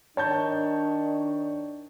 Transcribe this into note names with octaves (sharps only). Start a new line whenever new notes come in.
D#3 D4 C#5 A5 G6